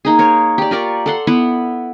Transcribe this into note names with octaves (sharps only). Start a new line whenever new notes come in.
A#3 D#4 G#4
A#4 C#5
G4 D5
F4 A#4 D5 C#6
A4 F#5 C6
B3 E4 F#5